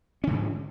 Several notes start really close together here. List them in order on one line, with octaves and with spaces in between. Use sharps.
C#4 D3 G#2 F3